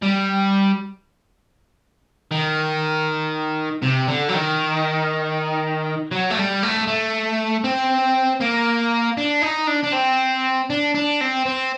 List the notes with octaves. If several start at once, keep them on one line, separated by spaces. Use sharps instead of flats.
G3
D#3
C3
D3
F#3
D#3
F#3
A3
G3
A3
A3
C4
A#3
D4
D#4
D4
D4
C4
D4
D4
C4
C4